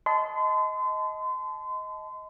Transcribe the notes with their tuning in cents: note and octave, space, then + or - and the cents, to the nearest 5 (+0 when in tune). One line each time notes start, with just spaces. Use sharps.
D#5 +15 A5 -20 C6 -35